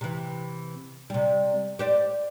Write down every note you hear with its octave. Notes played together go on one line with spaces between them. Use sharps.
C3 E3
C3 G3
G4 C5 D5